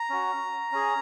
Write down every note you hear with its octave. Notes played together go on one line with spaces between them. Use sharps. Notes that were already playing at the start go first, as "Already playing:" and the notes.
Already playing: A#5
C#4 F#4
C#4 G#4